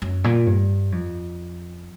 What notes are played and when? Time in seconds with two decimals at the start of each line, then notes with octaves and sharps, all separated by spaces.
0.02 F#2
0.24 A#2
0.47 G2
0.92 F2